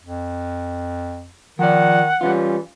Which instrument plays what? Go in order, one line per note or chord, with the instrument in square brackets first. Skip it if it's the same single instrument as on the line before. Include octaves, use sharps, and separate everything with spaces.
[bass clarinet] F2
[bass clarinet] D#3 [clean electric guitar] F3 D5 [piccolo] F#5
[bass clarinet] E3 [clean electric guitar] G3 C#4 F4